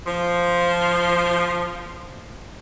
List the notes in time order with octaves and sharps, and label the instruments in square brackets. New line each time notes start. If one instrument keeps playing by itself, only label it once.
[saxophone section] F3 C5